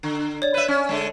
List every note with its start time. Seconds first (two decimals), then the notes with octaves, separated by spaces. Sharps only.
0.03 D3
0.42 C#5 D5
0.54 B4 E5
0.68 C#4
0.89 D3 G#3